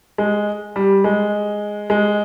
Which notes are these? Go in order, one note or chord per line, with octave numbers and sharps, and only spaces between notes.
G#3
G3
G#3
G#3